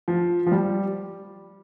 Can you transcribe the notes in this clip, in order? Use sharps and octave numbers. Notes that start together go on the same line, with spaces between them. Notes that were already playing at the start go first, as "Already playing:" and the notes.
F3
F3
G3